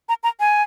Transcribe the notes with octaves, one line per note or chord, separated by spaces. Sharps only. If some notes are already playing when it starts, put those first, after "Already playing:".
A#5
A#5
G#5